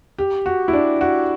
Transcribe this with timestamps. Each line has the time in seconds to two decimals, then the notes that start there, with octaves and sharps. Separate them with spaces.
0.19 G4
0.46 F#4
0.68 E4
0.73 D4
1.01 F#4